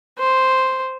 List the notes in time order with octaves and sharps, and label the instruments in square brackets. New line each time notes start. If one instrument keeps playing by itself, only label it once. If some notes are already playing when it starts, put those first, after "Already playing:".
[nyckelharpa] C5